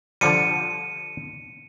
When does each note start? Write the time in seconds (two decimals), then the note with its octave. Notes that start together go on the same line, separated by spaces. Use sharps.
0.21 D3 F3 G3 C#7 D#7